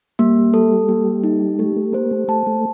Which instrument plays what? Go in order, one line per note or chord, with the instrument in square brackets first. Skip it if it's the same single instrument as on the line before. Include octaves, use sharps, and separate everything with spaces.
[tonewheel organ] G3 [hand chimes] A#3
[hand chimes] A4
A#3
D#4
[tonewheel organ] A3 [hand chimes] G4
[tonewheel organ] A3
[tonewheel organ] A#3 [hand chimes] C5
[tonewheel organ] A3
[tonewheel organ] A3 [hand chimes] A5
[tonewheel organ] A3